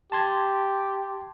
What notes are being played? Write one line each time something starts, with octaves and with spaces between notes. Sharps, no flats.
G4 A5 C6 G#6